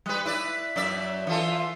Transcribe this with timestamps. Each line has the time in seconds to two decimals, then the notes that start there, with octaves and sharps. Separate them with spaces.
0.06 G3 B4
0.25 E4 B4 D5
0.76 F#2 D5 E5
1.27 E3 F4 A4